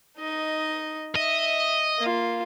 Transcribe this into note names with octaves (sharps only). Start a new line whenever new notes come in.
D#4 D#5
D#5 E5
A#3 F4